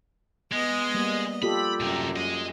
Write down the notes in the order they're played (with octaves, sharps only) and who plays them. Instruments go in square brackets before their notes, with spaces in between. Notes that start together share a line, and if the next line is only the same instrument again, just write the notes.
[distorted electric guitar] G#3 [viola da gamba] B3 D#5
[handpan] G3 A#3
[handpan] F4 G4 A4 [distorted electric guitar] B5
[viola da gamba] F#2 [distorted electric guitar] C3 A#4
[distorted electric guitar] G#4 D#5